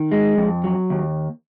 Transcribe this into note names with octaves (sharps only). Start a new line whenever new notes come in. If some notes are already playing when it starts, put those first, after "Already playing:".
Already playing: D#3
G#3
F2
F#3
D#2